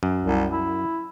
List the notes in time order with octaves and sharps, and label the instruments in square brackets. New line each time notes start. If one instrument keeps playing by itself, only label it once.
[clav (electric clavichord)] F#2
[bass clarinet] C2
E4